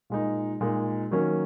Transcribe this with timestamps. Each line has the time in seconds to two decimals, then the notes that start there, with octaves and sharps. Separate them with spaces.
0.10 A#2 G#3 D#4
0.61 A#2 G#3 D#4
1.11 D#3 F#3 A#3 C#4